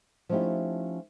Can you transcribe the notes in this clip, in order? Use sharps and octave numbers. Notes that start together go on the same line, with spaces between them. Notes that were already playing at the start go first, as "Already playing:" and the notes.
F3 A3 C#4 D#4 E4 G4